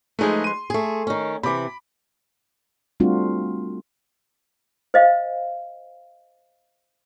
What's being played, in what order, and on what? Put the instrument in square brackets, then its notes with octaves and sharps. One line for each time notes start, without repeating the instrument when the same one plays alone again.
[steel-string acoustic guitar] F3 G#3 B4 [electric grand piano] A3 D#4 G#4
[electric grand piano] C6 D#7
[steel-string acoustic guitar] A3 G#4
D#3 C#4
[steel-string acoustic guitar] C3 E3 [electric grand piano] B5 D6
[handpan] G3 A3 C4 D4 F4 F#4
[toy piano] C5 D#5 F5